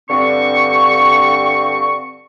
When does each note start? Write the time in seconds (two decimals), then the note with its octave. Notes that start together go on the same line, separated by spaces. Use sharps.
0.10 G2 D3 C4 C#6